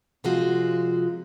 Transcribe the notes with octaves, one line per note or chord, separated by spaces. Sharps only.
C3 F3 G#3 F4 F#4